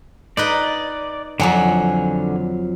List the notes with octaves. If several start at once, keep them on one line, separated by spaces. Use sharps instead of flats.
D#4 B4 D5 D#5
F2 D3 F3 F#3 F#5 G#5